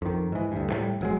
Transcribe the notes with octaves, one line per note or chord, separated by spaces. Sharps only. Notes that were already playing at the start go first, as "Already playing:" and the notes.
F2 D#3
G#2 E3
D2 G2
A2 E3 G3
E1 F#3 G#3